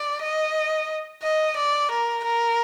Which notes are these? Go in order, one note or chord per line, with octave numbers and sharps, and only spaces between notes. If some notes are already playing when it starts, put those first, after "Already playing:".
Already playing: D5
D#5
D#5
D5
A#4
A#4